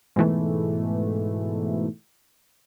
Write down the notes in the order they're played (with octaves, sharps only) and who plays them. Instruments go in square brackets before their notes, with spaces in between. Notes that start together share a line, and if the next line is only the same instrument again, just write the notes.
[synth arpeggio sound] G#2 B2 E3 A3